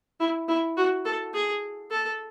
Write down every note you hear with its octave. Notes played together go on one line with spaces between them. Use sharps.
E4
E4
F#4
A4
G#4
A4